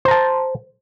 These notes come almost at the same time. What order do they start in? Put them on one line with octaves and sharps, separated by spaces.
C5 A#5 A5